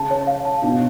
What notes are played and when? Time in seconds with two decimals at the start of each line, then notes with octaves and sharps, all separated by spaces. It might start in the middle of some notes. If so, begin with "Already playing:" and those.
Already playing: C#3 A5
0.11 C#5
0.27 F5
0.45 A5
0.62 B2 D4